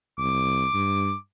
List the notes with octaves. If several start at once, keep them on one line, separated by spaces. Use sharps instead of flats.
C2 D6
G2